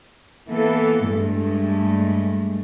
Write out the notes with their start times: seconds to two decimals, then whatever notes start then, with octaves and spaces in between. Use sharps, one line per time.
0.49 E3 A#3 B3 A4
1.07 G2 G#3 A3